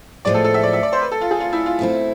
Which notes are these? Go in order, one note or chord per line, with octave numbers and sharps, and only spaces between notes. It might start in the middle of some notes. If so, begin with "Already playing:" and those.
A2 F3 G#3 B3 D5
A4
A4
E5
D5
E5
D5
C5
B4
A4
F4
G#4
F4
E4
F4
B2 A3 C4 E4